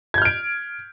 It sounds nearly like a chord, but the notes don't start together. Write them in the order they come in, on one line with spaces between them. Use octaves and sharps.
G#6 G6 F6 D7